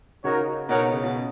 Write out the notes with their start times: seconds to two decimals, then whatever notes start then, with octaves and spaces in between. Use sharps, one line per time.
0.24 C#3 D#4 F#4 A#4 C#5
0.69 B2 D#4 A#4 C#5 F#5
0.92 C#3
1.03 B2